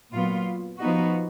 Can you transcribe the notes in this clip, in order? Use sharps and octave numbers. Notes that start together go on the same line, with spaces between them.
A#2 F#3 B3 F4
F3 B3 D#4 F#4